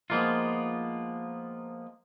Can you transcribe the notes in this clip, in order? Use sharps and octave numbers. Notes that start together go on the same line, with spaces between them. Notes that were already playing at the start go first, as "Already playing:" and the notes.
F3 G#3 A#3 B3 D#4 F4